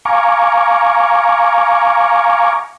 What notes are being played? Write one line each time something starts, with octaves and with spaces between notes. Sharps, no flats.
F5 G#5 A#5 C#6 D6